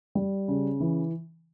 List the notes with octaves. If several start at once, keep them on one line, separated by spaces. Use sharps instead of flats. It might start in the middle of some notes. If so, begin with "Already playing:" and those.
G3
C#3
E3